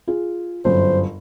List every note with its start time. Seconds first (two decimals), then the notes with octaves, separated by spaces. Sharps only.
0.08 F4 G#4
0.65 G1 F#2 C5